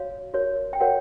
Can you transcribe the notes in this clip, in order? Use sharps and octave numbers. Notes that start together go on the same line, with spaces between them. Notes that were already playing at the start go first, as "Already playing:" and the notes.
Already playing: F#4 C#5 F5
F#4 A#4 C#5
G5
F#4 A#4 C#5 F#5